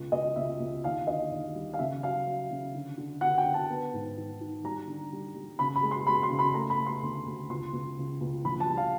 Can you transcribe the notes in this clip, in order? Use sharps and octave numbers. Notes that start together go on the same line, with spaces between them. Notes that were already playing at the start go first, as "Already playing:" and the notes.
Already playing: C#2
C#2 D#5
C#2 E5
C#2
D#2 F5
D3 D#5
D#2
G3
F5
C#3 E5
F#3 F5
F#3
C#3
D3
D3
D3 F#5
G5
D3
A5
B3
G#2
D#3
D#3
G3 A#5
D3
G3
G3
C#3 B5
B5
G#3
C6
G#3 B5
C6
C#3
B5
A3 A#5
B5
A3
C6
D2
D2
C#2 C6
C#2
C#3
C#2
A#1 B5
A5
G3
F5